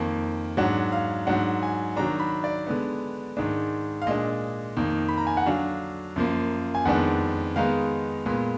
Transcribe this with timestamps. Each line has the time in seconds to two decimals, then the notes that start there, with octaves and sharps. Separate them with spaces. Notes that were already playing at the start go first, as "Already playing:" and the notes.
Already playing: F2 D#3 A#3
0.57 G#2 F#3 D4 F#5
0.92 F5
1.27 G#2 F#3 D4 F#5
1.63 G#5
1.97 D#3 F#3 D4 A#5
2.20 B5
2.44 D5
2.67 D3 G#3 B3
3.37 G#2 D#3 G#3 D4
4.02 F5
4.07 A#2 G#3 D4 D#5
4.77 F2 D#3 A#3
5.08 B5
5.18 A#5
5.27 G#5
5.37 F#5
5.46 D3 F#3 D4 F5
6.16 F#2 F3 A#3
6.75 G#5
6.85 F2 D#3 G#3 B3 D4 F#5
7.56 D#3 G#3 B3 D#4 F5
8.26 A#2 G#3 B3